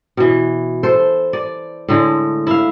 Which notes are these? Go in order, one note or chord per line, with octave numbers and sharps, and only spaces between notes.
B2 E3
A4 C5
D5
A2 D3 G#3
E4 F5